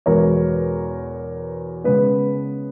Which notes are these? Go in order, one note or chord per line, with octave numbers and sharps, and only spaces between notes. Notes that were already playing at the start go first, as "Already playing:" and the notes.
E2 B2 G#3 B3 A#4 C#5
C#3 G#3 B3 B4